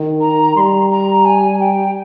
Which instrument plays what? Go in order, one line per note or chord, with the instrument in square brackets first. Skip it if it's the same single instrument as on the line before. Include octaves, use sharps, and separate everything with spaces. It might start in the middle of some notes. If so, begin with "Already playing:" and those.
Already playing: [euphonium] D#3
[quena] A#5
[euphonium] G3 [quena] A#5 C6
[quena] A#5
G#5
G5